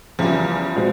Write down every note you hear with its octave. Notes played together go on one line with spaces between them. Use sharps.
E2 C#3 E3 F3 G3
B2 G#3 C4